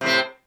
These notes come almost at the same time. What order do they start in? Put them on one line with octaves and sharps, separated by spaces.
C3 A2 C4